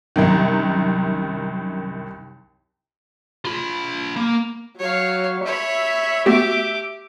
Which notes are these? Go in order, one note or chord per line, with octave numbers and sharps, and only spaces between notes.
C2 F#2 D#3
F4 B5
A#3
F#3 C#5 F5
C#5 E5 B5
A3 B3 F#4 G4 D6